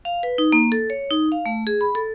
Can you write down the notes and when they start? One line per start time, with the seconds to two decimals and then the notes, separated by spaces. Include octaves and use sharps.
0.05 F5
0.23 B4
0.38 D#4
0.53 A#3
0.72 A4
0.90 C#5
1.11 D#4
1.32 F5
1.46 A3
1.67 G#4
1.81 B5
1.95 A4